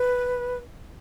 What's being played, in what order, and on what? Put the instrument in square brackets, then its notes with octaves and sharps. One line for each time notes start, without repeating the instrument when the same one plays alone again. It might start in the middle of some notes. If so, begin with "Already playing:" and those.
Already playing: [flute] B4